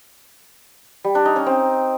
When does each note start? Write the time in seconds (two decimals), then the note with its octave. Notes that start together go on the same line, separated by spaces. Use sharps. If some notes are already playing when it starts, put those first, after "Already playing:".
1.04 G3
1.15 D4
1.25 D#4
1.36 C#4
1.46 C4